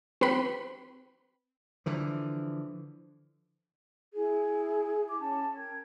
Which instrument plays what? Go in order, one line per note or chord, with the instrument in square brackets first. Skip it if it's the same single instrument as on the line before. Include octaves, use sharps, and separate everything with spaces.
[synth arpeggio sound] C4 B4 B5
[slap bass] D3 E3 F3
[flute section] E4 G#4
D6
C#4 A5
A#4 G5 G#6